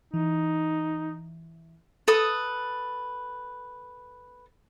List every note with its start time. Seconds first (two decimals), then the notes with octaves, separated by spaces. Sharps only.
0.14 E3 D#4
2.08 A4 B4 D#6